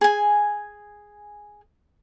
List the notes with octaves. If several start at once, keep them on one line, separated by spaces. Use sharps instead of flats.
G#4 G#5